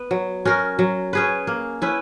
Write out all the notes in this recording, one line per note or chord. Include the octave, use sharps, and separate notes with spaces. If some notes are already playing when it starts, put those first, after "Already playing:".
Already playing: B3
F#3
C#4 F#4 A#4
F#3
C#4 G#4 B4
A#3
C#4 E4 B4